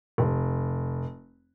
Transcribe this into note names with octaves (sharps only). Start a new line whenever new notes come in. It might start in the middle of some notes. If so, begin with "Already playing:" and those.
F1